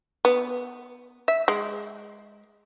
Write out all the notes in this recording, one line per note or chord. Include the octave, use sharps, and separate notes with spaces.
B3
E5
G#3